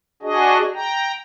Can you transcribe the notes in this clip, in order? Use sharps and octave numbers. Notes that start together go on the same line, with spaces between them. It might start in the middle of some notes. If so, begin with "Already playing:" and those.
D4 F#4 G#4 D#5
G5 A#5